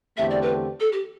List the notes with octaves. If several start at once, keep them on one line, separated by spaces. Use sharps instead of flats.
E2 D3 A3 C4 G4 E5
D5
B4
A4
G4